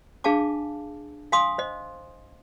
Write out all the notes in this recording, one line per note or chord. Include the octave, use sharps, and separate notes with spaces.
D4 G#4 F5 G#5 A5 D6
F5 G#5 C6 D#6
C5 D#5